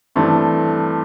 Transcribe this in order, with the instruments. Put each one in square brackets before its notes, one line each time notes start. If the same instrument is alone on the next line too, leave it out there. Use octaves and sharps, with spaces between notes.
[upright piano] G2 E3 A3 C4